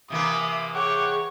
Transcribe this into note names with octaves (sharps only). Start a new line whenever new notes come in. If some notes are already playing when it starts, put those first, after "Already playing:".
C3 E3 A#3 D#6
G#4 C#5 F#5 G5 D6